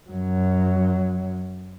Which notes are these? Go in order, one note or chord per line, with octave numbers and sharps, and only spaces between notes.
F#2 F#3